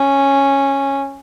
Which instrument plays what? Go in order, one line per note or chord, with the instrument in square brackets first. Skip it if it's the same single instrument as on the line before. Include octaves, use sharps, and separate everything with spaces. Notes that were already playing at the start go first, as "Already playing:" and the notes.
Already playing: [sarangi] C#4